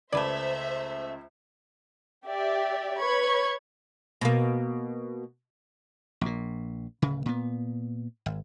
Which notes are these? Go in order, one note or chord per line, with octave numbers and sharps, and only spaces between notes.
C#2 A3 B4 C5 D5 E5 G#6
G4 D5 E5
B4 C#5 B5 C#6 G#6
B2 A#3
A#1 A#2
D1 C#3
A#2 B3
G#1